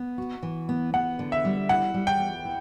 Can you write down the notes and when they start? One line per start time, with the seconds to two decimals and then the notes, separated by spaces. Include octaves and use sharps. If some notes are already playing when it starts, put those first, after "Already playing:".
Already playing: B3
0.18 F#4
0.43 E3
0.69 B3
0.94 B3 F#5
1.19 D3
1.32 E5
1.45 G3
1.69 E4 F#5
1.94 G3
2.07 G5
2.20 B3
2.45 E4